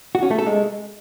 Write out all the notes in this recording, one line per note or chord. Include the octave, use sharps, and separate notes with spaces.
F#4
C#4
A3
A4
G#3